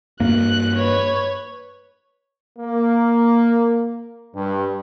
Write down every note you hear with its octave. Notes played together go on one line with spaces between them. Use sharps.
G2 A#3 F#6
B4 C#5
A#3
G2